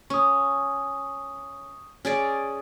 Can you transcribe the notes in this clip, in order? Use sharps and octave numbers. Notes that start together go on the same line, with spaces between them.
C#4 C#6 D#6
C#4 G#4 D5